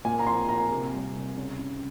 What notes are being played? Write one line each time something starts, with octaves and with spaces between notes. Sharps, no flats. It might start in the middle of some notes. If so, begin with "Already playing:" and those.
A#2 G#5
A#5
F3 C6
A#3 A#5
C3
G3
C3
C#3
C#3